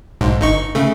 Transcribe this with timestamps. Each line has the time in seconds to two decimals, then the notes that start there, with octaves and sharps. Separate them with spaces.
0.21 B1 G#2
0.41 G1 D#4 C#6
0.75 C#3 A3